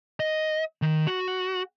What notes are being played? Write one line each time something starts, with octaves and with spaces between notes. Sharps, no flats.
D#5
D#3
F#4